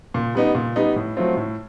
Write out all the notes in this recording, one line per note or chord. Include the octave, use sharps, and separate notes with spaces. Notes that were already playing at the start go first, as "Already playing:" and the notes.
A#2
G3 B3 D#4
A#2
G3 B3 D#4
A2
F#3 A3 C4 F4
A2